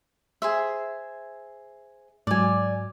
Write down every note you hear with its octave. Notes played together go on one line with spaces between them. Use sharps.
G#4 C5 E5
G#2 F#3 D5 G#5